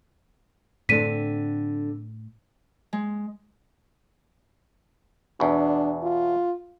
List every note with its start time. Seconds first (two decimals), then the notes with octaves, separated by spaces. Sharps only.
0.89 A2 D3 C4 D4 B6 D#7
2.93 G#3
5.40 E2 B2 D4
6.03 F4